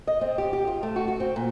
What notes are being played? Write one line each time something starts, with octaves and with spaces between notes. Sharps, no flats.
D#5
C4
G4
G4
F4
A3
F#4
F#4
C4
A#2